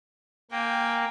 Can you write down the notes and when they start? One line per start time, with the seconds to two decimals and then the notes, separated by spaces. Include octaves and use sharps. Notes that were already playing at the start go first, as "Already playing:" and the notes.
0.51 A#3 G5 G#5